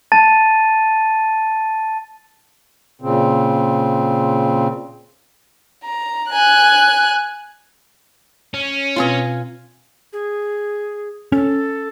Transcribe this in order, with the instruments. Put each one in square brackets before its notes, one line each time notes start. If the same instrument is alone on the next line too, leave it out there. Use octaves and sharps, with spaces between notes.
[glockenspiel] A5 A6 D#7
[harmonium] A#2 C#3 C4
[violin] A#5
G#5 F#6
[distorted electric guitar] C#4
[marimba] B2 C4 [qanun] F4 G#5 A#5
[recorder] G#4
[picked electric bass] C#4 [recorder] A4